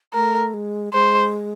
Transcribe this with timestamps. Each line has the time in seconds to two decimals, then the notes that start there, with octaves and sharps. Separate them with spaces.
0.14 A3 A#4
0.54 G#3
0.93 G#3 C5